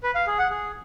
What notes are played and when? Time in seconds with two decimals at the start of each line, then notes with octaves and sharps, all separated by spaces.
0.03 B4
0.15 F5
0.27 G#4
0.38 F#5
0.50 G#4